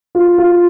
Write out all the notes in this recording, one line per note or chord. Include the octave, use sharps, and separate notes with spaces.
F4
F4